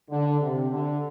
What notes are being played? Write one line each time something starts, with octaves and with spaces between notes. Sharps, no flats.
D3
C3
D3